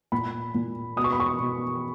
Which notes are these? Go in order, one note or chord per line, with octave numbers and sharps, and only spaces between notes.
A#2 B5
A#2
B2 D#6
C#6
B5
C#6
B2